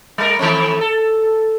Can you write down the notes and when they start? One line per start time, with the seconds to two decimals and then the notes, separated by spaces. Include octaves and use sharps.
0.18 G3 A#4
0.39 D#3 A3 C4
0.81 A4